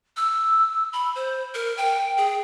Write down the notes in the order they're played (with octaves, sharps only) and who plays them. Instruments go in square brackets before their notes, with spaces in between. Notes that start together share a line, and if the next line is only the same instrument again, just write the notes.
[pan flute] E6
B5
C5
A#4
G5
G#4